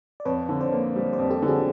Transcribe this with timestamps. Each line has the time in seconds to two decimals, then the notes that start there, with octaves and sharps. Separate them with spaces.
0.20 D5
0.25 F2 B4 C#5
0.49 D3
0.61 C5 D5
0.72 A#3
0.96 G3
1.13 C5 D5
1.19 F2
1.30 G4 A4
1.42 D3
1.48 F#4 G#4